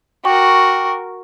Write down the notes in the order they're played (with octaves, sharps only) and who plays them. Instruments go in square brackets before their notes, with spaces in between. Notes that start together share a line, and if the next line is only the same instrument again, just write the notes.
[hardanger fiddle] F#4 A#4 [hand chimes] G5 C#6 D6